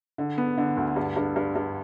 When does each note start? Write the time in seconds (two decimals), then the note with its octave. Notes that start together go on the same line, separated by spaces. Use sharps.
0.18 D3
0.38 B3
0.58 D3
0.77 D2
0.96 G2
1.16 G2
1.36 G2
1.56 G2